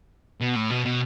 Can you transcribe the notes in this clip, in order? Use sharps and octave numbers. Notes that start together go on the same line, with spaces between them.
B2
A2
B2
B2